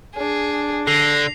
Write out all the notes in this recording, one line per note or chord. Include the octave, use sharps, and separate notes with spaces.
D4 G#4
D3 A#6 C7 F7